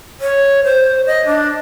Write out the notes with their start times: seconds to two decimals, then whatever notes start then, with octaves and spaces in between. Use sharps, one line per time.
0.20 C#5
0.64 C5
1.06 D#5
1.26 D4